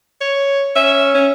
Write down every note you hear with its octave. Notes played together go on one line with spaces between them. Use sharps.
C#5
C#4 E5
C#4